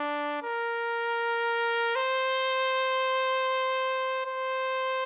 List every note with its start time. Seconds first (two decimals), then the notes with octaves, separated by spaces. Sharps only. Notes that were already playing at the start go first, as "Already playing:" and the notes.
Already playing: D4
0.43 A#4
1.96 C5
4.26 C5